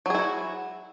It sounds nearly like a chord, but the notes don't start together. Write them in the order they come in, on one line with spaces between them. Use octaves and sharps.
F#3 G#4 E4 F#4